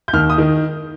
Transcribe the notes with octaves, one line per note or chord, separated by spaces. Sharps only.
G6
D#2 F6
D#6
D#3